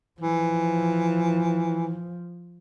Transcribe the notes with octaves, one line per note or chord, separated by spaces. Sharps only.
E3 F3